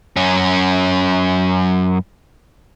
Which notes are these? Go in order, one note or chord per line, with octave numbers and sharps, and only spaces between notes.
F#2 C#4